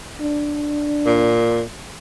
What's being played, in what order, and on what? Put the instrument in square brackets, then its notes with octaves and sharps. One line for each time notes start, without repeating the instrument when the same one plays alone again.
[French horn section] D4
[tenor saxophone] A#2